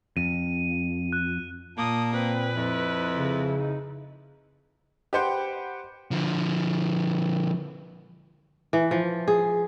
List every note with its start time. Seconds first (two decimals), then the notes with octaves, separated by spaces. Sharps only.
0.17 F2 D#7
1.13 F#6
1.78 A#2 A#3 A5 D#6
2.13 C4 B4
2.56 F2 E4
3.16 C#3
3.59 D#4
5.13 G4 B4 C5 F#5 G5
6.11 D3 F3
8.73 E3
8.91 F3
9.28 G#4